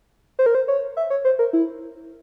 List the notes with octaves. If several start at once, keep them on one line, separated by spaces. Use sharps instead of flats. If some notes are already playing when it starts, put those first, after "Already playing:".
C5
A#4
C5
C#5
E5
C#5
C5
A#4
E4